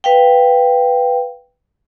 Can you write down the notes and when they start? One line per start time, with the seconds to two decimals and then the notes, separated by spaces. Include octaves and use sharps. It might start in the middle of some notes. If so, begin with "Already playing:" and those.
0.04 B4 F5 G5